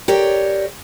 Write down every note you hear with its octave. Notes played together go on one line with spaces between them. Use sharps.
G4 A#4 C#5 D5